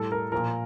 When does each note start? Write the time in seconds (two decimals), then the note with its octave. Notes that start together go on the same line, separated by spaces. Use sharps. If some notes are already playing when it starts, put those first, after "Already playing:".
Already playing: A2 G3 A4
0.12 A#4
0.32 A#2 F3 A#4